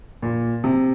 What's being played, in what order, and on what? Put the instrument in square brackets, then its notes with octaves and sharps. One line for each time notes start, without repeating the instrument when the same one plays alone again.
[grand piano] A#2
C3